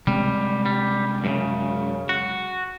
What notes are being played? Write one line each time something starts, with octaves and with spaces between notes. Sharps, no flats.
C3 G3 G#3 C4
G3
F#2 A2 C#3
F#4